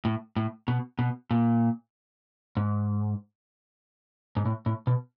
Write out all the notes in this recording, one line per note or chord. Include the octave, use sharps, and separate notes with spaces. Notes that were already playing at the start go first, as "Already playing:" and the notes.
A2
A2
B2
B2
A#2
G#2
G#2
A2
A2
B2